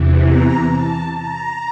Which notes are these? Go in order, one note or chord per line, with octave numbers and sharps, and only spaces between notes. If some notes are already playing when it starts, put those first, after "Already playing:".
Already playing: E2 C3 E3
A#5
A5
A#5